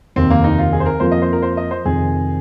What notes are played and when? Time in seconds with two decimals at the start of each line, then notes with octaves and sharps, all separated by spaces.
0.16 F1 D#2 D#3 C4
0.30 A#3
0.44 D#4
0.58 F4
0.73 G#4
0.80 C5
0.86 A#4
1.00 F2 F3 A#3 F4 C5
1.12 D#5
1.22 C5
1.33 A#4
1.42 C5
1.57 D#5
1.71 C5
1.85 F1 F2 D#3 G#4